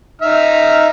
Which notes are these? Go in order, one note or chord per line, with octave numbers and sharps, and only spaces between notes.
D#4 E5 F6